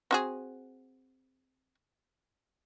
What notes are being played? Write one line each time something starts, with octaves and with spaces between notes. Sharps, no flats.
C4 F#4 G#4